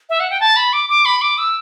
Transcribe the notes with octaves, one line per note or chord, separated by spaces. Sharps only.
E5
F#5
G5
A5
B5
D6
D6
B5
D6
E6